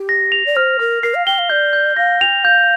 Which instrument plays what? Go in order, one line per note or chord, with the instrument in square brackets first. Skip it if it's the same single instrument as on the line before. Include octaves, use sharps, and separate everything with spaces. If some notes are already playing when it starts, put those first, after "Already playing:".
Already playing: [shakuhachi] G4
[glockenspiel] A#6
F7
[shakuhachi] D5
[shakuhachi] C5 [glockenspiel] F6
[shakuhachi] A#4 [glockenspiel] F6
[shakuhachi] A#4 [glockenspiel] C7
[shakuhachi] F5
[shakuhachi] G5 [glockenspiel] G7
[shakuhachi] F5
[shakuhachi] D5 [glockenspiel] G6
[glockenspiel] G6
[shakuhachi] F5 [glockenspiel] A#6
[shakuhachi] G5 [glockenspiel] F7
[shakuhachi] F5 [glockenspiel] G6